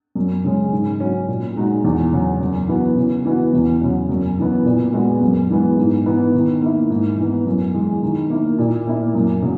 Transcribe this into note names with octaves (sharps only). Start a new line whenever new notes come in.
F#2
C#3 G#3 C#4
G#2
F#3 C#4 F#4
A#2
G#3 D#4 F#4
E2
C#3 F#3 C#4 F#4
F#2
E3 B3 F#4
C#3
E3 B3 F#4
E2
C#3 F#3 C#4 F#4
F#2
C#3 E3 B3
A#2
G#3 B3 F#4
F#2
E3 G#3 B3
G#2
E3 B3 D#4
D#3
A#3 E4
G#2
E3 B3
F#2
E3 G#3
D#3
A#3 E4
A#2
A#3 E4
F#2
C#3 F#3